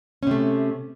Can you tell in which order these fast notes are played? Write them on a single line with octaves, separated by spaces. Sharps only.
C#4 C3 A3